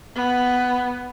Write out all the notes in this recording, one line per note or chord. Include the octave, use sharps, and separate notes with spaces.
B3